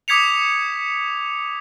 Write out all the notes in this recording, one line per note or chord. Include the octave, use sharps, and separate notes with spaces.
D6 D#6 G#6 B6 C#7 F7